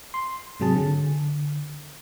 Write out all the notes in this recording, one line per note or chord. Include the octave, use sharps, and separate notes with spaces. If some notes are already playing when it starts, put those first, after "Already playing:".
C6
G#2 C3 F#3 G#4 A5
D3